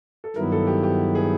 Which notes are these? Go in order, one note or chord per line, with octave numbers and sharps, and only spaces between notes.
A4
G2 D#3 F#3 B3 E4 A#4
A4
G4
G4
G#4